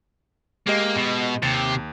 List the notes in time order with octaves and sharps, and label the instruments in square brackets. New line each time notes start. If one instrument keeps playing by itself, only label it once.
[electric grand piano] G#3 G4 D#5 [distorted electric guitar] A#3
[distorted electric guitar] B2
[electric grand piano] D#2 A6 [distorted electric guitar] C3